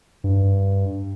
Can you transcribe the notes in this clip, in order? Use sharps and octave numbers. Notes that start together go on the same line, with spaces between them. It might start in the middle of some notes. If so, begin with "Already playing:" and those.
G2